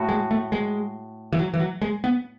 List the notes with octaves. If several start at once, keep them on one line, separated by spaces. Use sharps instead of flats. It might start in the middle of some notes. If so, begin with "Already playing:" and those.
Already playing: A2 F#4
G#3
A3
G#3
E3
F#3
E3
F#3
G#3
B3